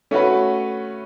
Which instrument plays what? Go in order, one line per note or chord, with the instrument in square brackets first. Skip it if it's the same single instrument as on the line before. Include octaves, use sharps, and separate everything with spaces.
[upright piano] A3 C#4 F#4 B4